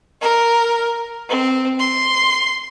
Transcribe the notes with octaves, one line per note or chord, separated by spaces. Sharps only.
A#4
C4
C6